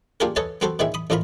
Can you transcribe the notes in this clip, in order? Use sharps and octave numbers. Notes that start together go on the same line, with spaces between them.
A#3 D4 F4 G4 G#4 A#4
A4 B4 C#5 D#5 G#5 A5
B3 C4 F#4 A4 B4 C5
A#2 D#3 C4 E4 G#4 E5
B5 D#6
A1 F2 F4 A#4 A#5 B5